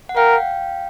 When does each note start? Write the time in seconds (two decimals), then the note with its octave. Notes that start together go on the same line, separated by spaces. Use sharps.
0.09 F#5
0.16 A#4 F5 G5